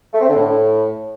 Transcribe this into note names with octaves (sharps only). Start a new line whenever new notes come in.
A3
C4
D3
A2